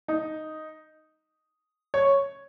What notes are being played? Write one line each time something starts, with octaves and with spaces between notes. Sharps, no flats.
D#4
C#5